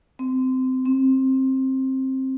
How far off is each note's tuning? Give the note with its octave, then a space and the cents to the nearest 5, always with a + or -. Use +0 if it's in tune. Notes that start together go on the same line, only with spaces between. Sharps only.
C4 -20
C4 +15